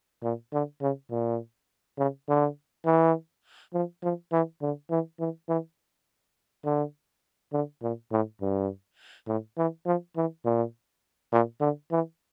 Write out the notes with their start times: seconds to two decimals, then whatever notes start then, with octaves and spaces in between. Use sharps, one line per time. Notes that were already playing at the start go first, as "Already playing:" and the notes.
0.23 A#2
0.53 D3
0.82 C#3
1.11 A#2
1.98 C#3
2.29 D3
2.86 E3
3.74 F3
4.03 F3
4.32 E3
4.62 D3
4.91 E3
5.20 E3
5.49 E3
6.65 D3
7.53 D3
7.82 A#2
8.12 A2
8.41 G2
9.28 A2
9.58 E3
9.86 F3
10.16 E3
10.45 A#2
11.33 A#2
11.61 D3
11.91 E3